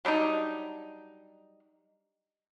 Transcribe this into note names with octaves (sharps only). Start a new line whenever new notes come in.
F#3 G3 D4 D#4